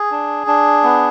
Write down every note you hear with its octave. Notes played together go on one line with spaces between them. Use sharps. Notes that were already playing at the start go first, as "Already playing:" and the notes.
Already playing: G#4
D4
D4
B3